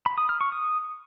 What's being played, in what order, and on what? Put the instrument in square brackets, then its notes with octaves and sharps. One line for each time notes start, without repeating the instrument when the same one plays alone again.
[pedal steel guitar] B5
D#6
F6
C#6
D#6